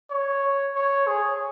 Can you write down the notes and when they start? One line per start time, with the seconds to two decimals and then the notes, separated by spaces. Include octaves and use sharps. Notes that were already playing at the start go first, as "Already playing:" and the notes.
0.11 C#5
0.76 C#5
1.07 G#4